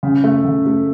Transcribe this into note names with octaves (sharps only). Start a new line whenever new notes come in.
C#3
A3
C#3
A3